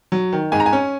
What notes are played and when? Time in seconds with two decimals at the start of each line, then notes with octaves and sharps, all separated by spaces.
0.12 F#3
0.33 D#3
0.52 G#2 G#5
0.60 A#5
0.66 G#5
0.73 C#4